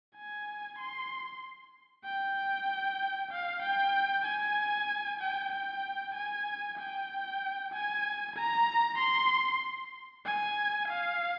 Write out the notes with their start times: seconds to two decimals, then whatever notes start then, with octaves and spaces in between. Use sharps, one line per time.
0.16 G#5
0.79 C6
2.05 G5
3.31 F5
3.63 G5
4.26 G#5
5.20 G5
5.52 G5
6.15 G#5
6.78 G5
7.73 G#5
8.36 A#5
8.99 C6
10.25 G#5
10.89 F5